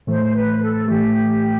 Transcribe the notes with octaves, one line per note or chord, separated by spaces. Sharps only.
A2 E3 A3 C5
B4
A4
A2 E3 A3 G4